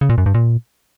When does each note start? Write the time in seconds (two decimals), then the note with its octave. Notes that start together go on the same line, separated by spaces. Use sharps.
0.01 C#3
0.10 A#2
0.18 F#2
0.26 G2
0.34 A#2